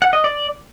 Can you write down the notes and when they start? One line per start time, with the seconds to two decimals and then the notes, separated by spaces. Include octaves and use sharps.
0.02 F#5
0.13 D#5
0.24 D5